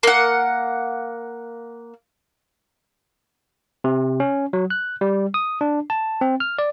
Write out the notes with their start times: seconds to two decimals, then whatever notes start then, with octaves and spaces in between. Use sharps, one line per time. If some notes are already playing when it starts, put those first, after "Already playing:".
0.03 A#3 F#5
3.84 C3
4.20 C#4
4.53 F#3
4.70 F#6
5.01 G3
5.34 D#6
5.61 D4
5.90 A5
6.21 C4
6.40 F6
6.59 D5